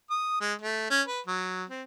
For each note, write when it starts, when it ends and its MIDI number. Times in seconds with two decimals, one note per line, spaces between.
0.11 0.39 87
0.41 0.54 56
0.62 0.87 57
0.90 1.02 61
1.07 1.21 71
1.27 1.64 54
1.69 1.83 60